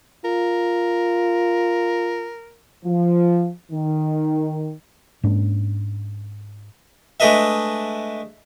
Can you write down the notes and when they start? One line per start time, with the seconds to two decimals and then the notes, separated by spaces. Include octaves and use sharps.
0.25 F4 A#4
2.85 F3
3.71 D#3
5.23 G#2 A#3 C#4 D4
7.20 G#3 A3 D4 B4 D#5 E5